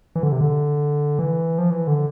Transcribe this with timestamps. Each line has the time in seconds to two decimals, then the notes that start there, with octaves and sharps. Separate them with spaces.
0.16 E3
0.23 D3
0.32 C3
0.41 D3
1.19 E3
1.58 F3
1.70 E3
1.87 D3